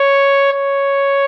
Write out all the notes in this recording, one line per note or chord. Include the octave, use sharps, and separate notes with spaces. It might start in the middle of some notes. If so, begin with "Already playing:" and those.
Already playing: C#5
C#5